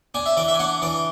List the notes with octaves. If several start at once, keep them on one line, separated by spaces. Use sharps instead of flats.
D4 G#5
E5
E3 D5
E5
G#5
D4 F#5
E3 D5